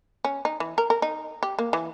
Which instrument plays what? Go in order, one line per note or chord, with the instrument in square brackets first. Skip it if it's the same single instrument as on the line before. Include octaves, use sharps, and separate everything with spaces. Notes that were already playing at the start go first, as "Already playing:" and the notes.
[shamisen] C#4
D#4
E3
A#4
A#4
D#4
G4
A#3
E3